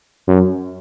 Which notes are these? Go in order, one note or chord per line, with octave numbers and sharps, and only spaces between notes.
F#2